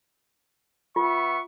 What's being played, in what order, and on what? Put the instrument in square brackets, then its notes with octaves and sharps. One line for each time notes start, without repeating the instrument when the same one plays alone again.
[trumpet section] B3 E5 C#6 [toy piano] F4